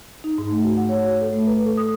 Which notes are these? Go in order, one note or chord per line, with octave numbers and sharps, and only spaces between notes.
D#4
G#2
A3
F#4
F#5
C#5
F#4
A4
A3
B4
A4
D#6